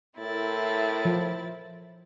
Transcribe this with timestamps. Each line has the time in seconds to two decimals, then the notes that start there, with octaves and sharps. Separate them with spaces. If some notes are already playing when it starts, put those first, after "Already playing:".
0.19 A2 C4 E4 A#4 A6
1.05 F3